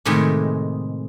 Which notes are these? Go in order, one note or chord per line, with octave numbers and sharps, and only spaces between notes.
A2 C3 D#3 G#3